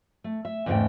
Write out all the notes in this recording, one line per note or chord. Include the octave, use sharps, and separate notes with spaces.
A3
E5
E2 G#2 C#3 F#3 A3 G5